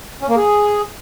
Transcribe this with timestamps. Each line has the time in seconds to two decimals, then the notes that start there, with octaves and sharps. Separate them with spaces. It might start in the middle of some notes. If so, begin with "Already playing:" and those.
0.22 C#4
0.29 A#3
0.36 G#4